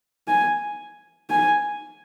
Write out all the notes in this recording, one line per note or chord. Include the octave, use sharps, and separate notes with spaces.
G#5
G#5